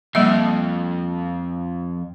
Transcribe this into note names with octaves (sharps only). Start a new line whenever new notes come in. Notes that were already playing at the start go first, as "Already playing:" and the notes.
F2 G3 A#3 E5